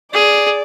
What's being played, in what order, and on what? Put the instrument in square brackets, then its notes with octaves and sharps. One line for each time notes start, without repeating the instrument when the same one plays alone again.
[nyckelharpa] G#4 [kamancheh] D5